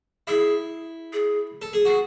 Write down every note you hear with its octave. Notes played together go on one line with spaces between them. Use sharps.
E4 G#4
G#4
A4
G#4
F#4 G#4